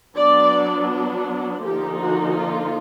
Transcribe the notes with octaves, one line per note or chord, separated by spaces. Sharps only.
F#3 B3 D4 D5
D3 F3 A#3 D#4 G4
F#4
F4